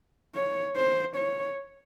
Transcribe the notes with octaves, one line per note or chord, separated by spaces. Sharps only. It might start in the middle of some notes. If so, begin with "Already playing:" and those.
C#5
C5
C#5